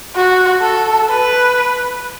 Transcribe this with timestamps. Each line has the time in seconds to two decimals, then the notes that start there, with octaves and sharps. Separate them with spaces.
0.16 F#4
0.62 A4
1.09 B4